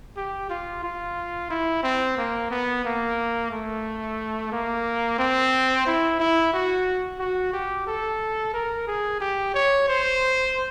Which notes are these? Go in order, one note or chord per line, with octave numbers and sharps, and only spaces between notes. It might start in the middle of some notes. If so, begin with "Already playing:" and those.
G4
F4
F4
E4
C4
A#3
B3
A#3
A3
A#3
C4
E4
E4
F#4
F#4
G4
A4
A#4
G#4
G4
C#5
C5